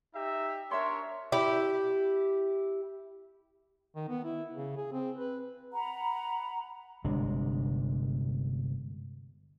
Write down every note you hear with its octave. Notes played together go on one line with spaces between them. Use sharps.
D#4 G4 E5
D4 A#4 C#5 E5 C6
E4 G4
D#3
B3
E4
C#3
G#4
C4
B4
F#5 A#5 B5
G1 C3 G#3 D4